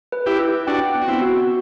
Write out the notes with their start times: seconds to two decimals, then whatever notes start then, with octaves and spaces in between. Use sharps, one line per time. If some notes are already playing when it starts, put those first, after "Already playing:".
0.12 B4
0.26 E4 G4
0.40 E4
0.67 D4 F#4 G5
0.95 B3
1.02 F#4
1.08 C4 E4
1.22 F#4